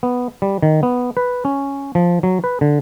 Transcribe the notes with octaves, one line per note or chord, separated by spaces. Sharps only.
B3
G3
D#3
B3
B4
C#4
F3
F#3
B4
D3